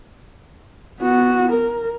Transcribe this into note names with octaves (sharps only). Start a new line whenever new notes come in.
B3 F#4
A#4